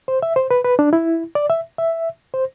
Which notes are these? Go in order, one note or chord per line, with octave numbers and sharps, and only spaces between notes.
C5
E5
C5
B4
B4
D4
E4
D5
E5
E5
C5